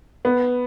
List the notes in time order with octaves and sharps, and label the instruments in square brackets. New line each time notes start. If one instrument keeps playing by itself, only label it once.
[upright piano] B3